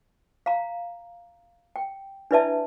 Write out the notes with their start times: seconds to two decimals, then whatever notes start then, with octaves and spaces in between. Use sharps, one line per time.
0.46 F5 A#5
1.76 G5
2.31 D4 E4 B4 D5 E5 A5